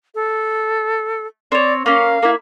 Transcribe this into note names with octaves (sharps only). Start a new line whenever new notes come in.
A4
C4 C#5 D5
A#3 C#4 F5
A#3 E4